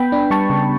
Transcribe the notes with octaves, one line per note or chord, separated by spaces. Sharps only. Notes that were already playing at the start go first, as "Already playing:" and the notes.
Already playing: B3 G5 B5
D4
G3 A5 C#6
C#3